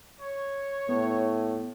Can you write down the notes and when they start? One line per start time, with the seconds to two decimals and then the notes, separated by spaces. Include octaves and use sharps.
0.20 C#5
0.89 A2 B3